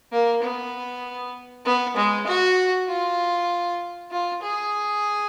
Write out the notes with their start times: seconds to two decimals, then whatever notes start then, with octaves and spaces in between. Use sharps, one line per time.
0.12 A#3
0.43 B3
1.65 B3
1.96 G#3
2.27 F#4
2.88 F4
4.11 F4
4.43 G#4